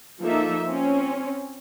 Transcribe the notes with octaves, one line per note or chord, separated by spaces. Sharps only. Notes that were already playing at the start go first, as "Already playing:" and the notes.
F3 A#3 D#4 F4 A4 E5
C4 C#4